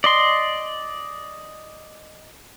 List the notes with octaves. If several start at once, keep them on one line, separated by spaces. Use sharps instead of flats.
D5 D#5 C6